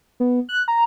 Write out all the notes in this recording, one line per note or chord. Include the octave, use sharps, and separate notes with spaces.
B3
F#6
A#5